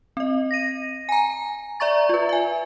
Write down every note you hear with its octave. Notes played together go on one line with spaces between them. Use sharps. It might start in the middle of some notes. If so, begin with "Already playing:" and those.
C4 D#5
A#6 D#7
G#5 A#5
D5 E5 A#5 C#6 A6
F4 B4
E5 G#5